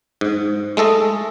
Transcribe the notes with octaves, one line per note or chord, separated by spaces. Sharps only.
G#2
G#3 A3 A4 D#5